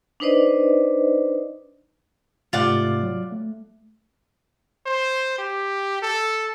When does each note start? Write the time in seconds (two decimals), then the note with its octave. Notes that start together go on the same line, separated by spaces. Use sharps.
0.20 D4 D#4 B4 C5 D5 D#5
2.53 G#2 C3 A3 F4 D5 F#5
3.03 F#3
3.32 A3
4.86 C5
5.38 G4
6.02 A4